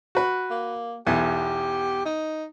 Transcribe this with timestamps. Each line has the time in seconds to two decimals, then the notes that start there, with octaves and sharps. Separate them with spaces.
0.15 F#4 B4
0.51 A#3
1.07 B1 E2 G4
2.05 D#4